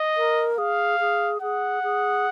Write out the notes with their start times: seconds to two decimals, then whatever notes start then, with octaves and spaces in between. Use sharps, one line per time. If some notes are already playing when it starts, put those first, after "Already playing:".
Already playing: D#5
0.17 A#4
0.58 G#4 F5
1.00 G#4
1.42 G#4 F#5
1.83 G#4